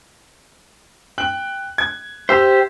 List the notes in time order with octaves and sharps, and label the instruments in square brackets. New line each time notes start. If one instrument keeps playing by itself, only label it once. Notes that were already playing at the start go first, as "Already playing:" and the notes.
[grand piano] G5 F#6 F#7
G#6
[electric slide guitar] G4 C5 [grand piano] E5 E6